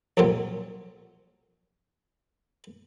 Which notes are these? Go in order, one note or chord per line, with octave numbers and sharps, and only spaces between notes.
C2 F2 A#2 F#3 C4